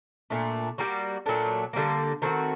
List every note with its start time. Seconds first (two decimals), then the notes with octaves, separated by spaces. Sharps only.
0.30 A#2 A3 D4
0.78 G3 A#3 F#4
1.26 A#2 F#3 A3 D4
1.73 D3 G3 A#3
2.22 D#3 A3 C4 F#4